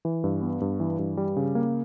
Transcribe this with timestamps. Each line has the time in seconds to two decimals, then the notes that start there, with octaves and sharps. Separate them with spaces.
0.05 E3
0.24 G2
0.42 B3
0.61 G2
0.80 E3
0.99 G2
1.17 G3
1.37 C#3
1.55 A#3